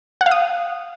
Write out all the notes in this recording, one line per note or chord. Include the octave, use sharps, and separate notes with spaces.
F#5
F5
D#6